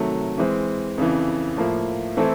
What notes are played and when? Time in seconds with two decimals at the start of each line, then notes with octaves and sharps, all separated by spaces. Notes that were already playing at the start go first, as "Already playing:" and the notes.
Already playing: C3 D#3 F#3 A3
0.38 E3 G#3 C4
0.98 F2 C#3 E3
1.57 A2 F3 A#3
2.17 E3 A3 C4 E4 A4